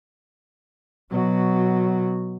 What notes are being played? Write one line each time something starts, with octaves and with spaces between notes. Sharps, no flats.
B2 F#3